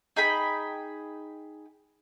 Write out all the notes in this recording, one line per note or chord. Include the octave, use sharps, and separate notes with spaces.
D#4 G#4 G5 B5